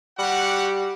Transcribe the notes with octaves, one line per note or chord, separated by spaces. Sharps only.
G3 F#4 G4 F#5